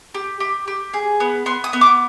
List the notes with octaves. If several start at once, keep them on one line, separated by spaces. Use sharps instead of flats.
G4
G4
G4
G#4
B3
B3 C6
D#6
B3
D6